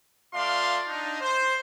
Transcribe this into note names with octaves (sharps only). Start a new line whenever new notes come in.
A3 F4 D5 F5 C6
D4 D#4
C5